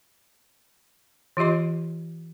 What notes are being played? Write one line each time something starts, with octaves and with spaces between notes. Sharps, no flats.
E3 F4 G4 D#5 C6